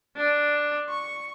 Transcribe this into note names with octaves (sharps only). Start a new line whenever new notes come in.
D4
C#6